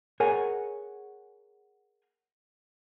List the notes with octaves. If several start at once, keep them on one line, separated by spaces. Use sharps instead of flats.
G#4 A#4 C#5 F#5 G#5